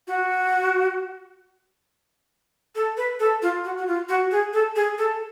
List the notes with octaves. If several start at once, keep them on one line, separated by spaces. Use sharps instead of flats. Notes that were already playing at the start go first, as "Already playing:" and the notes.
F#4
A4
B4
A4
F4
F#4
F#4
F4
F#4
G#4
A4
G#4
A4